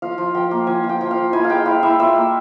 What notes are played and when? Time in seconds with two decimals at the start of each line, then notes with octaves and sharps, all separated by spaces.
0.02 F3 F5
0.18 F3
0.34 F3 G5
0.51 A#3
0.67 F3 G#5
0.84 F4
0.89 G5
1.01 F3
1.11 F5
1.17 F3
1.33 E4 G#5
1.44 F5
1.50 G#3 G5
1.65 E4 F5
1.83 E4 E5
1.99 F4 E5
2.16 A#3